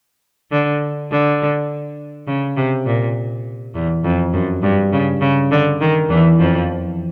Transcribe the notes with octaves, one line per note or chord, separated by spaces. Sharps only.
D3
D3
C#3
C3
A#2
E2
F2
F#2
G2
C#3
C#3
D3
D#3
E2 E3
F2 F3